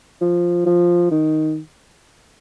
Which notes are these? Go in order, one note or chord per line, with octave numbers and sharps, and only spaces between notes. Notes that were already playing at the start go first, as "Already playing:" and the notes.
F3
F3
D#3